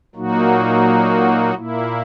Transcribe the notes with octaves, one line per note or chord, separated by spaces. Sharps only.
A#2 F#3 A#3 D#4 F#4
A#2 A#3 E4